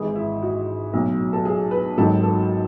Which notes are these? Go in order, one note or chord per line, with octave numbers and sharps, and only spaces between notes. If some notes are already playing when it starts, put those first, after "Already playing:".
Already playing: G#1 G#2 E3 G#4
E4
F#4
B1 A2 F#3
A4
G#4
B4
G#1 G#2 D#3 F#3 A4
A4